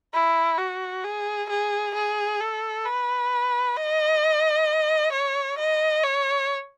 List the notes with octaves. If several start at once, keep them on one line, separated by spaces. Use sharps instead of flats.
E4
F#4
G#4
G#4
G#4
A4
B4
D#5
C#5
D#5
C#5